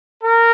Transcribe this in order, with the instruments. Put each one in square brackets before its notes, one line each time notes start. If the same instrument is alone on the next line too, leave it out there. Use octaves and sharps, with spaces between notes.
[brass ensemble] A#4